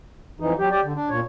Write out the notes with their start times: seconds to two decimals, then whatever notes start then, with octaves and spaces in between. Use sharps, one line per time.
0.40 F2 E3 D#4
0.59 F#3 G4
0.71 G4 D5
0.83 D3
0.95 D4
1.09 A#2 C#5